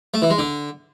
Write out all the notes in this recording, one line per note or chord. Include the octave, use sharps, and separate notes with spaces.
A3
E3
G#3
D3